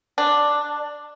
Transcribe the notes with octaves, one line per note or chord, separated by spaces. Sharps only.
D4